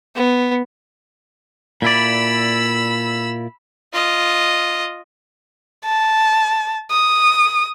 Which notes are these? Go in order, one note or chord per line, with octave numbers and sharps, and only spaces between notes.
B3
A#2 E4 D5 B5 E6
F4 D#5
A5
D#6